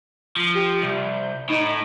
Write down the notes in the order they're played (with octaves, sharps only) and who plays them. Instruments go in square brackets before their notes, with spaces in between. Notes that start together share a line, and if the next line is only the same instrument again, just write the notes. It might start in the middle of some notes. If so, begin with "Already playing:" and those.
[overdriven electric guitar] F3
[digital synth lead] G4
[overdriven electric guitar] C2 [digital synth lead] G6
[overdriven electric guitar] A2 [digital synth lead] D#4